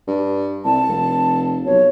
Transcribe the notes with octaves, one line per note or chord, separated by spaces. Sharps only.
G2
C2 A5
F1
B1 C#5